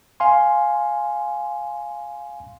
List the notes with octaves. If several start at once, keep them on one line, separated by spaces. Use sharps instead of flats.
F5 G#5 C6